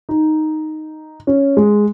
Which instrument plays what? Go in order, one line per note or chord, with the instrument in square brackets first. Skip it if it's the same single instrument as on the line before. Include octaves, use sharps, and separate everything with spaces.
[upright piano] D#4
C#4
G#3